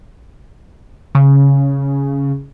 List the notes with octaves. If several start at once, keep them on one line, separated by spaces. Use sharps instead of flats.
C#3